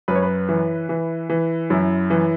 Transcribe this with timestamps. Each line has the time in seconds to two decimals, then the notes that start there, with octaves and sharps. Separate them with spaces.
0.08 F#2 B4
0.15 C#5
0.23 B4
0.49 E3
0.89 E3
1.30 E3
1.70 F#2 E4
2.10 E3